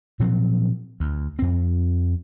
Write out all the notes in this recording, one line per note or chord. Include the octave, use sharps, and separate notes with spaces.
A#2 F3 F#3 C4
D2
F2 C4